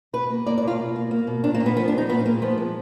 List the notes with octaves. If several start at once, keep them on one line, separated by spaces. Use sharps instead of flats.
B2 B4
A#3
A#3 D5
D5
B2 F4
B2
A#3
A#3
B2
A#2 D4
A#3
A#2
B3
F3 B3
D4
G#3
D#4
A#2 B3
A#2 A#3
F3 B3
G#3